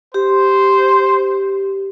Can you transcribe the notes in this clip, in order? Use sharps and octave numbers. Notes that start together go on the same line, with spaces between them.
G4 C5